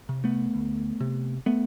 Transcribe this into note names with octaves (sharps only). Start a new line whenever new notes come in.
C3
A3 B3
D2
C3
A3 B3